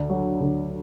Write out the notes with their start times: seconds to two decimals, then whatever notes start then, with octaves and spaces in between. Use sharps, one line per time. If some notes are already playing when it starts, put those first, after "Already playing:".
Already playing: D2 D5
0.09 F#3
0.41 D2